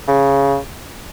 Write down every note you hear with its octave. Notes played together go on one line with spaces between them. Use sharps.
C#3